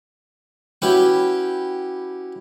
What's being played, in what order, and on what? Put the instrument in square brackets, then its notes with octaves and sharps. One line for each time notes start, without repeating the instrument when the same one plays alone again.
[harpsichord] C#4 E4 F#4 G4 B4 G5